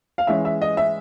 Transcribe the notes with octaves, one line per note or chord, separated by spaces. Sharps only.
F5
E3 G#3 C#4 E5
E5
D#5
E5